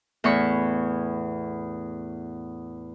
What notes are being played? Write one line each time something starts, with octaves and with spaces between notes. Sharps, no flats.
E2 A2 B5 C#6